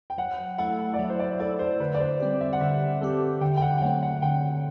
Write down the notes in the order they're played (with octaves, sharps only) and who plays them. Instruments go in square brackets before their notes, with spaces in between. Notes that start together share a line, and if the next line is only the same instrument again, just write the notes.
[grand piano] G5
[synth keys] F#3 [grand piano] F#5
[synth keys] A3 E4 A4 [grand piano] F#5
[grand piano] D5
[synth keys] F#3 [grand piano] E5
[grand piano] C5
D5
[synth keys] A3 E4 A4 [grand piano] D5
[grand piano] C5
[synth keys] D3 [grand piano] B4
[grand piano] D5
C5
[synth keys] G3 C4 G4
[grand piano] E5
F#5
[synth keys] D3 [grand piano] E5
[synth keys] G3 C4 G4 [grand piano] A4
[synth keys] D3 [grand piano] G5
[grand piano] G5
F#5
G5
[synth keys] F#3 A3 C4 [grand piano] F#5
[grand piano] F#5
[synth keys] D3 [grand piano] G5